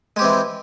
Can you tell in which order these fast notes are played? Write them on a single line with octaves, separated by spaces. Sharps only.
G#3 G4 C4 E3